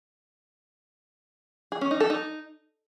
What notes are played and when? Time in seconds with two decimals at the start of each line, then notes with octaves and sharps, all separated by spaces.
1.72 G#4
1.81 C#4
1.91 D#4
2.00 A4
2.10 D#4